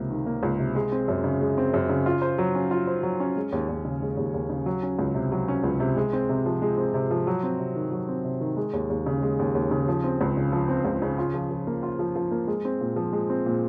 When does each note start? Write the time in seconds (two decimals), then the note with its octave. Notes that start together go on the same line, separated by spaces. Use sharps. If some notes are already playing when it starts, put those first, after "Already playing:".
Already playing: C#2 C3 A#3
0.10 D#3
0.26 A#3
0.43 C#2
0.59 C3
0.75 G#3
0.92 C4
1.08 F#2
1.24 C#3
1.41 G#3
1.58 C4
1.74 F#2
1.89 C#3
2.06 F4
2.22 C5
2.38 F#3
2.55 C#4
2.71 F4
2.87 C5
3.03 F#3
3.20 C#4
3.36 G#3
3.52 D#2
3.69 D#2
3.85 C#3
4.02 G#3
4.17 D#2
4.34 D#2
4.50 C#3
4.66 F#3
4.83 C#4
4.99 C#2
5.15 C3
5.32 F#3
5.48 C#4
5.64 C#2
5.80 C3
5.97 G#3
6.13 C4
6.29 C3
6.46 F3
6.62 G#3
6.78 C4
6.94 C3
7.10 F3
7.27 F#3
7.43 C4
7.59 C3
7.76 D#3
7.92 F#3
8.09 C4
8.24 C3
8.41 D#3
8.57 G#3
8.73 D#2
8.90 D#2
9.06 C#3
9.22 G#3
9.39 D#2
9.55 D#2
9.71 C#3
9.88 F3
10.04 C4
10.21 C#2
10.37 C#3
10.52 F3
10.68 C4
10.85 C#2
11.02 C#3
11.18 F4
11.34 F3
11.51 F3
11.67 A#3
11.83 F4
11.99 F3
12.16 F3
12.31 A#3
12.47 G#3
12.65 C4
12.81 A#2
12.96 F3
13.13 G#3
13.30 C4
13.46 A#2